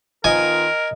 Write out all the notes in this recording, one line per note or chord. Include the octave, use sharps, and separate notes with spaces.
D#3 B3 F4 A#4 D#5 G#5